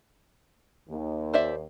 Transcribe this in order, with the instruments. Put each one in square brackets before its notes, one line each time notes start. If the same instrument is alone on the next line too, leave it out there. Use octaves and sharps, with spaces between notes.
[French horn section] D#2
[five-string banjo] C5 D5 E5